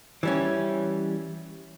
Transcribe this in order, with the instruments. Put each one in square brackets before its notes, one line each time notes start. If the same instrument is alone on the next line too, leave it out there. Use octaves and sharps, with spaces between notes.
[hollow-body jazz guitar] E3 G3 C#4